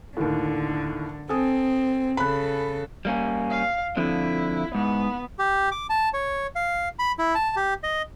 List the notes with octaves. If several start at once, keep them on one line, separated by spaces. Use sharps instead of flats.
D#2 A2 D3
C4 A4 G#5 D#6
C#3 A4 B5 F#6
G3 A#3 C#4
F5
D3 F3 C4 E4
G#2 B3
G4
D6
A5
C#5
F5
B5
E4
A5
G4
D#5